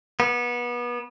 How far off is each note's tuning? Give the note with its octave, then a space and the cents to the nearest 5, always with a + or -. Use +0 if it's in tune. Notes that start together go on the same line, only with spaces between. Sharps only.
B3 -30